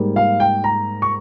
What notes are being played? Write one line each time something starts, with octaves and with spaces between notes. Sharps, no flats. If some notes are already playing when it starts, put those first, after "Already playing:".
Already playing: G#2 G3 A#3
F5
G5
A#5
C#6